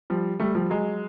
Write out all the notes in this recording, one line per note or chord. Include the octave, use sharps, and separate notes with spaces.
F3 G3
G3 A3
F3 G3
F#3 G#3